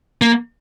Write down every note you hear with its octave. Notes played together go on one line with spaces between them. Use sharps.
A#3